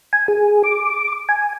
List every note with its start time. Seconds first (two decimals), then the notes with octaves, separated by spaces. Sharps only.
0.13 G#5
0.28 G#4
0.63 D6
1.29 G#5